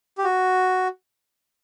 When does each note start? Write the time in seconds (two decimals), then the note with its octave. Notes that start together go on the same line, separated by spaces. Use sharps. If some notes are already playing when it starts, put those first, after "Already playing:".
0.18 G4
0.24 F#4